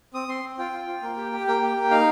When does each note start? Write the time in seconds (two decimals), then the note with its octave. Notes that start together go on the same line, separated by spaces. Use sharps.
0.14 C4 D#6
0.28 C4 C6
0.43 C4
0.58 F4 G5
0.73 F4
0.87 F4
1.02 A#3
1.17 G4
1.32 G4
1.47 A#3 G5
1.62 G4
1.77 A#3
1.91 D#4 F5